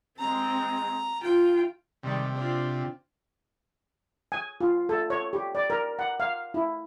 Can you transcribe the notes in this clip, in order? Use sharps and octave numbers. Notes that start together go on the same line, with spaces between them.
G#3 C4 A#5
F4 G5
C3 D#3 G3 G#3
C4 D4 F4
G#5
F4
A4
C#5
G4
D5
A#4
F#5
F5
E4